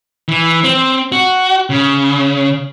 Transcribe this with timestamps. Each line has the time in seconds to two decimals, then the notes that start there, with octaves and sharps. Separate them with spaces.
0.28 E3
0.64 C4
1.12 F#4
1.70 C#3